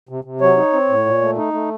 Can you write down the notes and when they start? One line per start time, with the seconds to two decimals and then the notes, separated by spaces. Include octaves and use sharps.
0.09 C3
0.24 C3
0.41 F#3 C#5
0.57 D#4
0.73 C4
0.89 A2
1.05 A#2
1.21 A3
1.37 D#4
1.53 A3